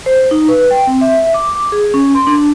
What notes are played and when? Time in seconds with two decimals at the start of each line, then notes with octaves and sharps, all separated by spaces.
0.06 C5
0.31 D#4
0.49 B4
0.71 G5
0.87 C4
1.01 E5
1.34 D6
1.55 D6
1.72 G#4
1.94 C#4
2.15 C6
2.27 D4